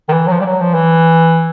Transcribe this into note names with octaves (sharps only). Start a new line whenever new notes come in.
D#3
E3
F#3
F3
G3
F#3
F3
E3